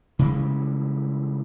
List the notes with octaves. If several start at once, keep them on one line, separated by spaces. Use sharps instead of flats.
C#3 E3 G3 G#3